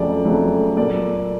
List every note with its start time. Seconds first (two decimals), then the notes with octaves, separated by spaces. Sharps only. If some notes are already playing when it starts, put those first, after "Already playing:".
Already playing: F2 C#3 F#3 A3 D5
0.25 F2 C#3 F#3 A3
0.77 A#2 F#3 A#3 D5